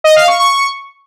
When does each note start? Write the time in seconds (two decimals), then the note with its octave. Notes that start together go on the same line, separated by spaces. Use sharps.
0.04 D#5
0.16 F5
0.28 C#6
0.40 C#6